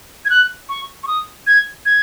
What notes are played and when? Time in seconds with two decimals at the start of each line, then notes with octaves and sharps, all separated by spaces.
0.25 G#6
0.30 F#6
0.69 C#6
1.03 C#6
1.07 D#6
1.47 G#6
1.86 G#6